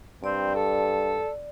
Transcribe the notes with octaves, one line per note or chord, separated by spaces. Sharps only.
G2 C4 D5
A4